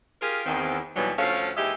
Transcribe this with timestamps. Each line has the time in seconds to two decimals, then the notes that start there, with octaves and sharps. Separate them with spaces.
0.21 F4 G4 G#4 A#4
0.46 E2 D#3 C4
0.96 D#2 B2 E3 F#3 G3 E4
1.18 D2 F3 A3 C#4 F5
1.57 D#2 E3 G#3 G4 D#5 E5